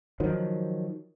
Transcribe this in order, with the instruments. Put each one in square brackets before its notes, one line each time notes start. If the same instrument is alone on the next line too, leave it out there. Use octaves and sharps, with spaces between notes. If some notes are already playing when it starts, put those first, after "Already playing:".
[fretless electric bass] D#3 F3 F#3